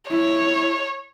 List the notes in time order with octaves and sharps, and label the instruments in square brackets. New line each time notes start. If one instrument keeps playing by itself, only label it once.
[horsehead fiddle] E4 [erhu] C#5